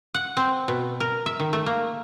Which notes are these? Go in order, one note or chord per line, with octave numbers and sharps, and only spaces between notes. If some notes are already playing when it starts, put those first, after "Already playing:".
F#5
C4
B2
A#4
E5
D#3
A3
A#3